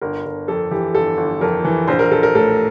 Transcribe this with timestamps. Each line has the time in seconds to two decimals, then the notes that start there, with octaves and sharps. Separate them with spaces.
0.02 G1 A#4
0.25 G1
0.48 F2 A4
0.71 E3 G4
0.95 G1 A4
1.17 G1
1.41 F2 A#4
1.65 E3
1.88 A#1 C5
1.99 A#4
2.11 A#1 A4
2.23 A#4
2.35 A2 A4